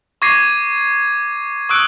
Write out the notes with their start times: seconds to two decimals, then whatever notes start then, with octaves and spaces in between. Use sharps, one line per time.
0.22 C#6 D6 G#6 A#6 C7 D#7
1.69 C#6 D#6 E6 F#6 D7